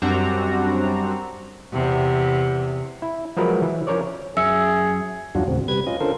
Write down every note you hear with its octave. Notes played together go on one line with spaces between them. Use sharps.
F#2 G3 C4 D4 F#4 A#5
E2 C3
E4
F3 F#3 G#3 A#4 B4
E3
F3 C#4 A#4 C#5 D5
F#2 G#4 E5 E6 C#7
E2 G2 F#3 D4 F4 F#4
D#2 A2 C#3 C4
C3 G3 B4 G#6
C#4 F4 D#5
D3 C#4 F4 A4 A#4 C5